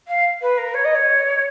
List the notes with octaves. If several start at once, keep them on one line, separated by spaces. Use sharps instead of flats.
F5
B4
A#4
C#5
D#5
C#5